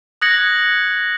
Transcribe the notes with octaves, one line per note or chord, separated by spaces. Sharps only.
D#6 F#6 G#6 A#6 C#7 F#7